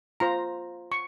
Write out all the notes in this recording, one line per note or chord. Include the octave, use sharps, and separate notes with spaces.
F4 C5 A#5
C#6